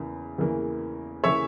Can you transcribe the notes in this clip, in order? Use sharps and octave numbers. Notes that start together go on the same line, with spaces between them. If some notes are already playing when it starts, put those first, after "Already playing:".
Already playing: E2 C#3 E3 A#3
E2 C#3 E3 A#3
C#3 E3 A#3 C#5 E5